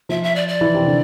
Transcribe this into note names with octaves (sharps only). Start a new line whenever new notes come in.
F3 E5
E5
D5
D5
E3
C3
D3